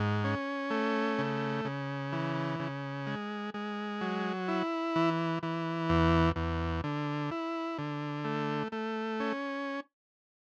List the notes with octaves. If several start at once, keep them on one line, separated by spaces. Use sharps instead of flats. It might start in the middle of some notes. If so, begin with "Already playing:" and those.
Already playing: G#2
C#4
A3
C#3
C#3
E3
C#3
G#3
G#3
F#3
E4
E3
E3
E2
E2
D3
E4
D3
A3
A3
C#4